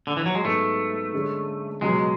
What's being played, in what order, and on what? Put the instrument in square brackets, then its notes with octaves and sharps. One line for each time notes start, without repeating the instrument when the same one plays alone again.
[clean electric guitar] D3
E3
F#3
G#3
[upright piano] G#2 F#3 B3 [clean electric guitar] A3
[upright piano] D3 G#3 C#4
[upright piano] C#2 B2 F#3 [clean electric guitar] G#3